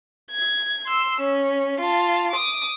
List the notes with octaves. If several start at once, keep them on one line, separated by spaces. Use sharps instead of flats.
G#6
C6 E6
C#4
F4 A5
D6 D#6